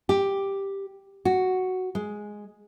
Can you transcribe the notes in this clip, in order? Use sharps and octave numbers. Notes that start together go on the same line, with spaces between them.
G4
F#4
G#3